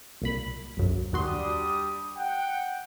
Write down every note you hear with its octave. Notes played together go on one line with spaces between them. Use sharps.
C2 A#2 B5
B1 F#2
D#2 G3 D4 F#4 C6 D#6
F#5 G5